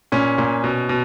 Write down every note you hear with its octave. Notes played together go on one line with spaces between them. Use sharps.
A#2 C#4
A#2
B2
B2